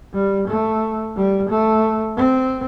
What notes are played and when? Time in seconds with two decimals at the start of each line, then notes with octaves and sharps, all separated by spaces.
0.14 G3
0.48 A3
1.16 G3
1.50 A3
2.17 C4